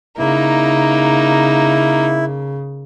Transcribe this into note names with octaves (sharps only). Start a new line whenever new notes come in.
C#3 A#3 D#4 E4